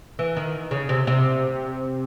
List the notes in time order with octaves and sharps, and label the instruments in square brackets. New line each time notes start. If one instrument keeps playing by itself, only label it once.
[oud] E3
D#3
C#3
C3
C3